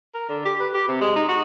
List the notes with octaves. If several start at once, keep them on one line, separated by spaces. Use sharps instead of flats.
A#4
D3
G4
B4
G4
C3
G#3
D#4
F#4